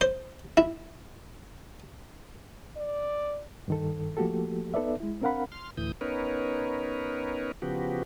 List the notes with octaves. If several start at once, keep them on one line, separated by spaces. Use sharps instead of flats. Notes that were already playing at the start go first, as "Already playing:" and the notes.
C5
E4
D5
G2 D#3 A4
F3 A3 A#3 F#4 G4 A4
B3 D#4 A4 B4 D5 E5
G#3 E4
C4 D4 A#4 F5 F#5 B5
C6 F6
D2 A2 E3 D#6 G6
B3 C#4 D#4 A#4 B4 C#5
C#3 F3 B3 F#4 G4